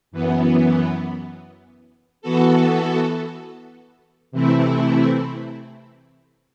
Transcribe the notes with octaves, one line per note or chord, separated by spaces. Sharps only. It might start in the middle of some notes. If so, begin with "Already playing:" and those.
F#2 E3 B3
E3 B3 F#4 A4
C3 E3 A3 C4 E4